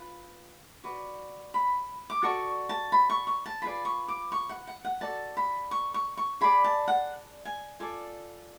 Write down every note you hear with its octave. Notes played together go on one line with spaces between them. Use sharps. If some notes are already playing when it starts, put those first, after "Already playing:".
Already playing: F4 B4
F#4 B4 D5
B5
D6
F#4 A4 D5 C#6
A5
B5
C#6
C#6
A5
F4 G#4 B4 D5 B5
C#6
D6
C#6
F#5
F#5
F#5
F#4 A4 D5 A5
B5
C#6
C#6
C#6
G#4 D5 B5
A5
F#5
G#5
F4 A4 D5 G#5